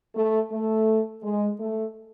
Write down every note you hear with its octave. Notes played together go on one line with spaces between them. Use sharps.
A3
A3
G#3
A3